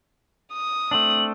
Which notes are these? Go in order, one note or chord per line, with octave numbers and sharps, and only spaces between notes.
D#6
A3 C4 D4 F#7